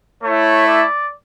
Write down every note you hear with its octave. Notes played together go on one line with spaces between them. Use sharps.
A3 C#5
E4
D5